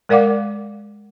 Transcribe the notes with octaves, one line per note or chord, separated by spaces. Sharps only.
G#3 A#4 D5 F5 F#5 D6